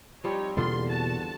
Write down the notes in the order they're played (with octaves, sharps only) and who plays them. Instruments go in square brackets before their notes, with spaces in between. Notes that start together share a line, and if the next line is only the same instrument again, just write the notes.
[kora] F3 G3 C4 [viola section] D#4 G4 C#5
[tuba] E2 [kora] G2 D3 F4 [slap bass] B2 A#3 [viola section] C6
[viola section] F#4 A5